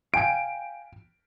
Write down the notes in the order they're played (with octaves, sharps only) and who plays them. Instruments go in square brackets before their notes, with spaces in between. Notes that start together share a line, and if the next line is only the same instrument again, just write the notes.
[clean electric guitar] F5 G5 G#5 [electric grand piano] D7